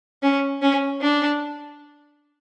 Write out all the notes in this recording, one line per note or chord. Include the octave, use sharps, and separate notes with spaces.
C#4
C#4
D4